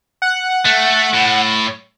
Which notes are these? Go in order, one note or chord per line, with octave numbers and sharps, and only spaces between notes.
F#5
A3
A2